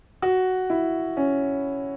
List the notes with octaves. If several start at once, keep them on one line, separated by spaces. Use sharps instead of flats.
F#4
E4
C#4